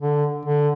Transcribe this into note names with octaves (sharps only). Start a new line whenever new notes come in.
D3
D3